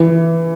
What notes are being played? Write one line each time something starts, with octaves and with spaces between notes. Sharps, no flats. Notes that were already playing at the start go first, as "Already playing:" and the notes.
Already playing: E3